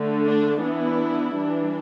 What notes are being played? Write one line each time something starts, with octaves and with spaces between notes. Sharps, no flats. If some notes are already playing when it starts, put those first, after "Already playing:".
Already playing: D3 A3
D4
E3 B3 D4 E4
E3 G3 D4